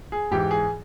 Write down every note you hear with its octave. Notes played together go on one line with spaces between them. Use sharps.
G#4
G#2 E3 G4
G#4